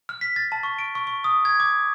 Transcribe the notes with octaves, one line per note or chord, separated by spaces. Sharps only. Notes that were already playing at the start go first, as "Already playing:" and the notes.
F6
B6
A6
A5
C#6
D7
C#6
C#6
D#6
G#6
D6